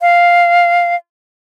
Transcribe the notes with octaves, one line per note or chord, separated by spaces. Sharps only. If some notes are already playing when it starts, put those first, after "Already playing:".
F5